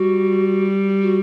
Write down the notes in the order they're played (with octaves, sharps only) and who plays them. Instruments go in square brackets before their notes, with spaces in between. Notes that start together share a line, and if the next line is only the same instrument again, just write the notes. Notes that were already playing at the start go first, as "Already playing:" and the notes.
Already playing: [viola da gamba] G3 [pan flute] F#4
[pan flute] F#4